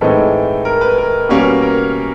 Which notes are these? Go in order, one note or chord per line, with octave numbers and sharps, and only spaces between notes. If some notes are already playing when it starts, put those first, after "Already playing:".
A2 E3 G#3 C4 D#4 A4
A#4
B4
A#4
B2 G3 A#3 C#4
A#4